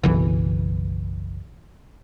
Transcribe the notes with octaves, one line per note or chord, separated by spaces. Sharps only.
F#1 B1 E3